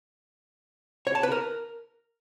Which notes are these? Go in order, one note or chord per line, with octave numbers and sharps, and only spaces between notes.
C#5
A5
B4
A#4